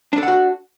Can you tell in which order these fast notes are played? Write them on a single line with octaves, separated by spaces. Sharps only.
D4 A4 F#5 F#4